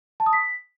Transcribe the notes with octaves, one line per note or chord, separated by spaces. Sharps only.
A5
D#6
B6